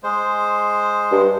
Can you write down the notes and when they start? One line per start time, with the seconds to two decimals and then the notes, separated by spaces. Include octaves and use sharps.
0.04 G#3 C5
1.11 G2